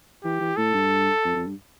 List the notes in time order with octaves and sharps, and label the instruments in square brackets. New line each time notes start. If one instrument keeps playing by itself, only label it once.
[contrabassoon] E3 [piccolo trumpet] G4
[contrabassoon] E3
[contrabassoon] A2 [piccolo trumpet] A4
[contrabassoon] G2
F2
F2
G2